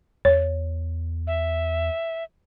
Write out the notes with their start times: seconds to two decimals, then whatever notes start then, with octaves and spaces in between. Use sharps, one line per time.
0.25 E2 C#5
1.27 E5